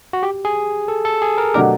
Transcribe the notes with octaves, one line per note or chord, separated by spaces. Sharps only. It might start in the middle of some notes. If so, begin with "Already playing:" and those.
F#4
G4
G#4
A4
A4
G#4
A#4
B2 F#3 A3 D4 G4 A#4